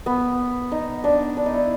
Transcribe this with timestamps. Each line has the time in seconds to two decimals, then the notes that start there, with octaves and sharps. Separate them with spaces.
0.06 B3
0.72 D#4
1.04 D4
1.37 D4
1.46 D#4
1.53 E4